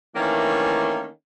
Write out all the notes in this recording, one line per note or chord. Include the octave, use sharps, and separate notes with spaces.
D#3 E3 A3 A#3 C#4 D4